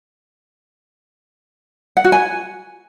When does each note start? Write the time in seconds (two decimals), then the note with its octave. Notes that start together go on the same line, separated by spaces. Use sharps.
1.97 F#5
2.04 F#4
2.12 G#5